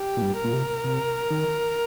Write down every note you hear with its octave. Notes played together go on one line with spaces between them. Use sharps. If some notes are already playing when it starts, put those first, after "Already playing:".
Already playing: G4
A#2
G2
A#4
A#2
C3
C3
D#3